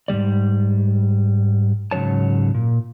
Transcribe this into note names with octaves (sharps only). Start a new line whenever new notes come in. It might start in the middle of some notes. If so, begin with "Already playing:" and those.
G#2 D#3 G3 D5
G#2 C#3 F#3 C#5 A5
A#2